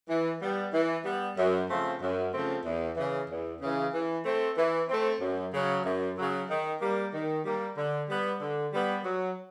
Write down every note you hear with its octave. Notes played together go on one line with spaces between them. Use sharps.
E3
G3 B3
E3
G3 B3
F#2
C#3 F3 A3 C4
F#2
C#3 F3 A3 C4
E2
C#3 E3
E2
C#3 E3
E3
A3 C4
E3
A3 C4
F#2
C#3 F#3
F#2
C#3 F#3
D#3
G3 A#3
D#3
G3 A#3
D3
G3 B3
D3
G3 B3
F#3